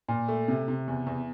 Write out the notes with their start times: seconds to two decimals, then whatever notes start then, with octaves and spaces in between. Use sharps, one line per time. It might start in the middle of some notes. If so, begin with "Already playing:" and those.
0.08 A#2
0.28 A3
0.48 C3
0.68 C3
0.88 E2
1.07 E2